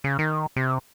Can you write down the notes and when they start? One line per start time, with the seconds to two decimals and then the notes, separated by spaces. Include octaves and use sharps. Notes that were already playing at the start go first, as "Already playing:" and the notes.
0.04 C#3
0.19 D#3
0.56 C3